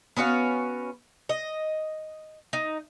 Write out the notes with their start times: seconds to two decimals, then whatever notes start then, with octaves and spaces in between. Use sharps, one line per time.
0.17 B3 C#4 F#4 F5
1.29 D#5
2.53 D#4